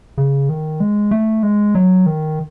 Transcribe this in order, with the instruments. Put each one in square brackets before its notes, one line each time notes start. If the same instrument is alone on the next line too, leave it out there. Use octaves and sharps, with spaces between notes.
[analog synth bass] C#3
D#3
G#3
A3
G#3
F#3
D#3